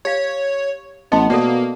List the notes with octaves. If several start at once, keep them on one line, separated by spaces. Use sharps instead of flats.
G4 C#5 F5
A1 B3 D#5 A5 C6
B2 A#3 A4 D5 F#5